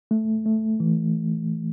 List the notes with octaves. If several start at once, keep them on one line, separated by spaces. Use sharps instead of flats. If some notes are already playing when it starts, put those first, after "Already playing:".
A3
A3
E3